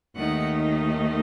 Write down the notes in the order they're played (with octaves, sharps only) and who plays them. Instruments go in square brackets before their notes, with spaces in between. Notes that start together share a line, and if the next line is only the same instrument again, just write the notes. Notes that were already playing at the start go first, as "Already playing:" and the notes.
[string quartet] D#2 D#3 A3 D#4 F#5